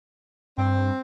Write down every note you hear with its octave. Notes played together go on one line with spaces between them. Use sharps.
G2 C4